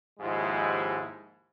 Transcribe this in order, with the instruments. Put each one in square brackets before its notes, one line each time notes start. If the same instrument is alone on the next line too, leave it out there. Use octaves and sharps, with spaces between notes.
[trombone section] D#2 G#2 F3 G#3 E4 G4